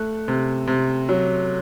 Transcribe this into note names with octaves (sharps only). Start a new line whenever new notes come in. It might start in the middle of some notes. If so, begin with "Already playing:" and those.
Already playing: A3 F#6
C3
C3
F#3